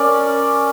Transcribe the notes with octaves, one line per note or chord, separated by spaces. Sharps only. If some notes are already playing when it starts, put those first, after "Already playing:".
Already playing: C#4 A#4 D5